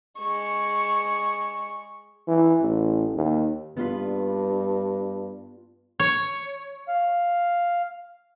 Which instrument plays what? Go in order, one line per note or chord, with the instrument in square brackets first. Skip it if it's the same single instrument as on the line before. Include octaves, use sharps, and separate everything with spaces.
[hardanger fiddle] G#3 C#6
[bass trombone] E3
A1
D#2
[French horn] G2 [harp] B3 F4 B4
[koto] C#5
[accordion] F5